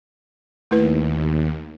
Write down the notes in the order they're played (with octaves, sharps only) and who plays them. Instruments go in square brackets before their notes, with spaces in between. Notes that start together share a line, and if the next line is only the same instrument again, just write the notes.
[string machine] D#2 [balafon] A3 E4 B4